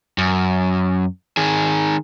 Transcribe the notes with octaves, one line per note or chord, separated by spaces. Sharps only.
F#2
D#3 G#4